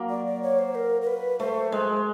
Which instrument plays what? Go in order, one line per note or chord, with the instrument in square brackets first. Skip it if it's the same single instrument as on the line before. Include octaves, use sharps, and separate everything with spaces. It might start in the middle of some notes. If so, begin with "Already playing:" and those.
Already playing: [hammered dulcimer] F#3 A#3
[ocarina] D5
D5
C#5
C5
A#4
A#4
B4
[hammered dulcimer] A3 [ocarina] C5
[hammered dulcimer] G#3 [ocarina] C5